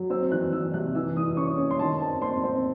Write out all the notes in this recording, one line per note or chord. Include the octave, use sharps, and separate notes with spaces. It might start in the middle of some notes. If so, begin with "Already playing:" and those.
Already playing: F#3
C4 E6
E3 F#6
E3 E6
C3 F#6
E3 E6
E3 D#6
C#4 C#6
C#4
C6
D#3 A5
C4 A5
C4 C6
C4